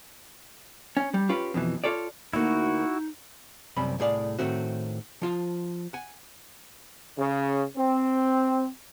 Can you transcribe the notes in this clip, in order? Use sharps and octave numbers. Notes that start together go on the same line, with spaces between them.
C#4
G3
C#4 F4 G4 B4
F2 B2 E3
F4 A4 C#5 D5
D2 A#3 D#4 E4 F#4
C2 F#2 C3 G3 C4 B5
C2 A2 G#4 D5 F5
A2 D#3 A3 C4 F#4
F3 F4 F5
F#5 G#5
C#3
C4